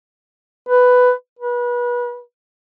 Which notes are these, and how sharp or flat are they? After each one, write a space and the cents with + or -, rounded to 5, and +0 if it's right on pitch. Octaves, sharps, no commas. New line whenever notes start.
B4 +10
B4 -30